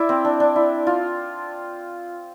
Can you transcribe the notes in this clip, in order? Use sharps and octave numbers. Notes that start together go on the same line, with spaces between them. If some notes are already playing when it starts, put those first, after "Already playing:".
Already playing: E4 D5 E5
C4
D4
D4
E4
F4